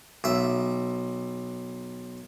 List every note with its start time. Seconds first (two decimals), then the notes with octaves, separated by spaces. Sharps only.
0.24 B1 E5